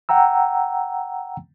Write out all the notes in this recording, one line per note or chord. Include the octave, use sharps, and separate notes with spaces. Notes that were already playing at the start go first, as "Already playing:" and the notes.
F#5 G5 A#5 E6